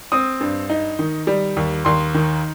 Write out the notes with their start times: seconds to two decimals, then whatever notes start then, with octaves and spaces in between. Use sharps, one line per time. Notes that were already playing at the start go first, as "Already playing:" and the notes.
0.12 C4 D#6
0.40 G2
0.70 D#4
0.99 D#3
1.27 G3
1.57 D#2
1.85 D#2 C6
2.14 D#3